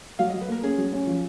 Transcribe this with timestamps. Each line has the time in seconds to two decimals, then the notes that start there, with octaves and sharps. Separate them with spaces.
0.19 F#3 F5
0.29 F#3 D#5
0.41 B4
0.48 A#3 A#4
0.63 C#4 G#4
0.78 F#3
0.93 C#4
1.07 F3